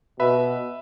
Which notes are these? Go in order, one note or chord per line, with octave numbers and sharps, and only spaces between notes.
B2 B4 E5 B5